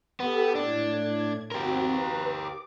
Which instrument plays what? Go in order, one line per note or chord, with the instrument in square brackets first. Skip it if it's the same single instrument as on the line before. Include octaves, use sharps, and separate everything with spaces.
[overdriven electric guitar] B3 [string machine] G4 A4 E6
[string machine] A2 G#6 [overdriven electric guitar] D4
[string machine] C4 F#4 [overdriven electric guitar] G4 A#4
[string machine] B4 A#5
D6